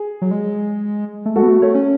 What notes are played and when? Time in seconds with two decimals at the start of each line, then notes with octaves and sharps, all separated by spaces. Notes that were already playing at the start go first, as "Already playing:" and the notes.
Already playing: G#4
0.22 F#3
0.31 G#3
1.26 A3
1.36 G#3 F#4 A4
1.43 B3
1.48 A3
1.62 A3 A4 C#5
1.75 C#4